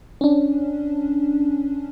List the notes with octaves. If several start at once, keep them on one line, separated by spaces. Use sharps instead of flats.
C#4 D4